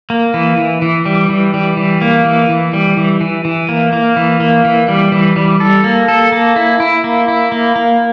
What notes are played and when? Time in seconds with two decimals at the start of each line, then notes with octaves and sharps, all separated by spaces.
0.10 A#3
0.34 E3
0.58 E3
0.82 E3
1.05 G3
1.30 E3
1.54 G3
1.77 E3
2.01 A#3
2.25 E3
2.49 E3
2.73 G3
2.97 E3
3.21 E3
3.45 E3
3.69 A#3
3.93 A#3
4.16 E3
4.40 A#3
4.65 E3
4.88 G3
5.12 E3
5.36 G3
5.60 A4
5.84 A#3
6.08 A4
6.32 A#3
6.56 E4
6.80 E4
7.04 A#3
7.28 E4
7.52 A#3
7.76 A#3